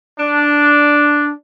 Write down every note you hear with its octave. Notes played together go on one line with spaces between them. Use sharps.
D4